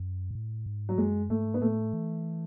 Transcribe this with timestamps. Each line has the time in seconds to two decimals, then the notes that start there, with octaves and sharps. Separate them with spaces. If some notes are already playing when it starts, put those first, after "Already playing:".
Already playing: F#2
0.31 G#2
0.35 A2
0.66 G#2
0.89 F#3
0.98 F#2 G#3
1.30 G#2 A3
1.54 B3
1.62 A2 A3
1.93 E3